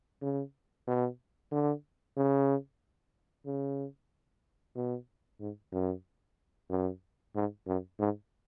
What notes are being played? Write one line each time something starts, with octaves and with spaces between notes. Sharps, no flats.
C#3
B2
D3
C#3
C#3
B2
G#2
F#2
F#2
G#2
F#2
G#2